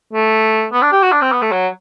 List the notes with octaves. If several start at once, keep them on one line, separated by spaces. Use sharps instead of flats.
A3
B3
D4
G4
F#4
D4
C4
B3
A3
F#3